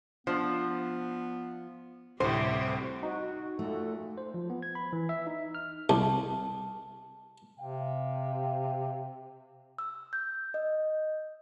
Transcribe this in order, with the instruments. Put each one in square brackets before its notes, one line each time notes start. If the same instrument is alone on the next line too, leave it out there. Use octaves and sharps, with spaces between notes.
[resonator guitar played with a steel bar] F3 [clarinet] B3 [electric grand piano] D4 C5
[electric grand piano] D2 A2 [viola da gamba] C3 G3 [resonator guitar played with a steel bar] C5
[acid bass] D#4 [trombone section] F#4
[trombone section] A#2 F#4 A4 [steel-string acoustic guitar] A3
[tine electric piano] C5
F3
B3
G#6
B5
E3
E5
D#4
F6
[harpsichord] C2 [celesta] A5
[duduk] C3 [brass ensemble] G4 F5 G5
[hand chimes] E6
G6
D#5